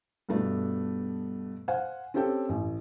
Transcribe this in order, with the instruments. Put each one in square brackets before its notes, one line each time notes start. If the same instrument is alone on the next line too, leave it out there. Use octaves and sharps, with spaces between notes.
[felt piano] G2 B2 A3 B3 D4
C5 F5 F#5 G#5
C4 C#4 G4 A4 G5
A1